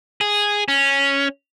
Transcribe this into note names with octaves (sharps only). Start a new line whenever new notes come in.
G#4
C#4